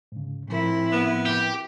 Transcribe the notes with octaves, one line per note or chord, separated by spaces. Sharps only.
G#2 C#3
A2 F3 C4 E4 A#4
B3
G4